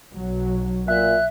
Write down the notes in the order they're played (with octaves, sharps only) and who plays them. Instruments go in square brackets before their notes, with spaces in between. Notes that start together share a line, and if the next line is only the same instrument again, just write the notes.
[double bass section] B1 F#3
[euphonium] A#2 [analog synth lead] E5 [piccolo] F#6